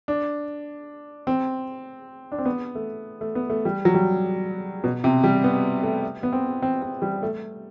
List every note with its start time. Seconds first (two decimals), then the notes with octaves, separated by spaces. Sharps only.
0.08 D4
1.27 C4
2.32 D4
2.39 C4
2.45 B3
2.75 A3
3.21 A3
3.35 B3
3.50 A3
3.65 G3
3.85 F#3
3.94 G3
4.84 B2
5.04 C3
5.24 G3
5.44 B3
5.83 A3
6.23 B3
6.33 C4
6.62 C4
6.82 C4
7.02 G3
7.23 A3